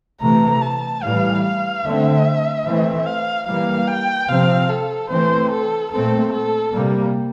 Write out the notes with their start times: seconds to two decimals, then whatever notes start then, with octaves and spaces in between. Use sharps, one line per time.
0.21 C3 E3 A3 A#5
0.62 A5
1.02 A2 E3 G3 F5
1.44 F5
1.84 D3 A3 C4 E5
2.66 E3 A3 C4
3.06 F5
3.47 E3 G3 A#3 F5
3.88 G5
4.28 C3 F3 C4 F5
4.69 A4
5.10 E3 A3 C4 C5
5.51 A4
5.91 A#2 A3 C4 A4
6.32 A4
6.73 C3 G3 A#3